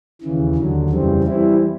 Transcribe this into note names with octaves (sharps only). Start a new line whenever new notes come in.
D#2 C#3 E3
D#2 D3 F#3
F2 C#3 E3 G3 C4
E3 G3 C4 E4